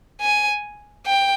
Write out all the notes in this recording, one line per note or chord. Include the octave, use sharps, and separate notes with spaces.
G#5
G5